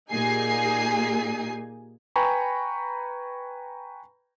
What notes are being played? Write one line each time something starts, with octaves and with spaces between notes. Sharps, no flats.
A#2 D#4 G4 G#4 G#5 C7
B4 G5 G#5 A#5 B5 C#6